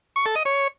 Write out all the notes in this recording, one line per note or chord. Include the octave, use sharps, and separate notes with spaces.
C#6
A4
D#5
C#5